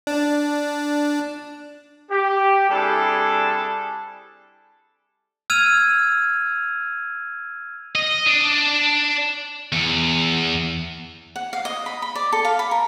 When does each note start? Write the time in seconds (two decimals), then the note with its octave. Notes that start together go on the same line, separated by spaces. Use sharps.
0.07 D4
2.11 G4
2.70 G3 C4 D4 E4 G#4 A4
5.50 E6 F6 G#6 D#7 F7
7.95 D#5
8.27 D4
9.72 E2
11.36 F#5
11.53 F5
11.65 D#5
11.86 B5
12.02 B5
12.15 D5
12.32 A4
12.45 F5
12.59 B5
12.71 A#4